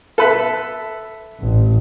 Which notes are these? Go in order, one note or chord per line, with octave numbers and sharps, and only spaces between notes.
A4 B4 E5
A1